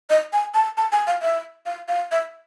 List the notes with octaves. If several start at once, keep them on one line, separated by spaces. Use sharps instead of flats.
D#5
G#5
A5
A5
G#5
F5
E5
F5
F5
E5